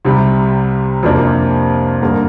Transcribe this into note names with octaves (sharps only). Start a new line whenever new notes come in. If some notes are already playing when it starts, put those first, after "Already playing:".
C2 C3 G3
F2 C3 A#3 D4
G2 D3 A#3